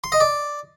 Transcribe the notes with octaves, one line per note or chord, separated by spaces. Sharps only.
C6
D#5
D5